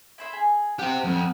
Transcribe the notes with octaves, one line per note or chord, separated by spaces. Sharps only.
E4 C5 E5
G#4
G4 C5 F#5
F2